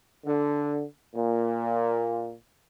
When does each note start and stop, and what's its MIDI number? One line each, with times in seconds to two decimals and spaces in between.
0.24 0.83 50
1.15 2.35 46